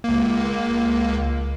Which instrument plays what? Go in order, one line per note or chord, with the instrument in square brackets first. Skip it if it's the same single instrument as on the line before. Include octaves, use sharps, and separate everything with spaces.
[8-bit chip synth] C#2 A#3